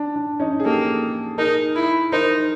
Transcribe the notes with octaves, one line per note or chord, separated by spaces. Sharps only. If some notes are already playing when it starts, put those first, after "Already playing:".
Already playing: D4
D4
C#4 D#4
G#4
A#3 G4 A4
D#4 G#4 A#4
E4
D#4 A#4 C5